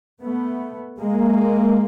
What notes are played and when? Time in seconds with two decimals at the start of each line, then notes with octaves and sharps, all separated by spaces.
0.21 A3 B3
0.99 G#3 A#3